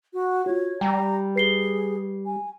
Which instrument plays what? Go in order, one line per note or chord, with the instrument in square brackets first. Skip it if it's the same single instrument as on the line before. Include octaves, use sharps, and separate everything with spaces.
[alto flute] F#4
[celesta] F4 F#4 [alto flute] C#5
[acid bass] G3 [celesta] G5 [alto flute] A#5
[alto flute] G#4 [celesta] B4 C7 G7
[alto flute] G#5